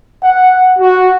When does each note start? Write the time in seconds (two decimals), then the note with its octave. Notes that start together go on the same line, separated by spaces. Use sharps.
0.23 F#5
0.78 F#4